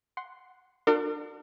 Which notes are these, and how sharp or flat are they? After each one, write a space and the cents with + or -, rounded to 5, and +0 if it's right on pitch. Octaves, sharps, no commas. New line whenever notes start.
F#5 +0 C6 +0
D4 +30 F#4 -25 A#4 -35